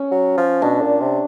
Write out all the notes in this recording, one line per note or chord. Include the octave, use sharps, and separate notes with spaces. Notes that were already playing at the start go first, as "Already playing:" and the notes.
Already playing: C#4
F#3
F3
B2 D4
A#2
C3